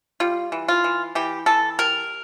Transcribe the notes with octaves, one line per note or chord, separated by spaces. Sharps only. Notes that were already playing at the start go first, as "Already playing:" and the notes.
G3 F4
E3
F4
E3
E3 G4
E3 A4
G3 A#4